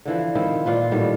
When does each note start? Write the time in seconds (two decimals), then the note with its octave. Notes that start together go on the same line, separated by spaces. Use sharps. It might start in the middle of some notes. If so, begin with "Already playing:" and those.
0.05 D3 E3 F3
0.35 D#3 F3 C4 E4
0.65 A#2 F4 B4 F5
0.91 A2 D#3 G3 B3